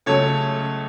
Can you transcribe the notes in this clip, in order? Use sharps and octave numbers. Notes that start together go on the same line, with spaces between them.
C#2 C#3 F#3 A3 A4 C#5